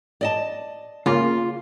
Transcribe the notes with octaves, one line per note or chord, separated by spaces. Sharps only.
D5 D#5 A5
C#3 A#3 F4